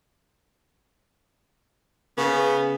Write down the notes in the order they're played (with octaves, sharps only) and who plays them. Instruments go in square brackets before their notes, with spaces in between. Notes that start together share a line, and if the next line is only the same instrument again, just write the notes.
[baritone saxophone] C#3 [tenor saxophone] B3